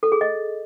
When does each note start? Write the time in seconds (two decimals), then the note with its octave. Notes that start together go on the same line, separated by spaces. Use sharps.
0.03 A4
0.12 G#4
0.21 D#5